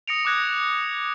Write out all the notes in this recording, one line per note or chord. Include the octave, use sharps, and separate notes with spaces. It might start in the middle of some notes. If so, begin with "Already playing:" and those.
D#6 A#6 C#7 D7 F7
D6 D#6 F#6 G#6 A#6